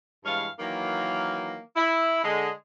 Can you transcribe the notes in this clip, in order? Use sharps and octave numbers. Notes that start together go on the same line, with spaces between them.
G2 E3 G#3 C#5 F5
D#3 E3 F#3 A#3
E4
D3 G#3